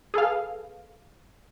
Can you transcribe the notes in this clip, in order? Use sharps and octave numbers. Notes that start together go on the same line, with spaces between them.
G#4 A4 B4 F5